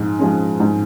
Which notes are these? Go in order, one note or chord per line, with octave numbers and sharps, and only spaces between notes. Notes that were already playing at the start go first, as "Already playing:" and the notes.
Already playing: G#2 F3 G#3
F3 G#3 C#4
G#2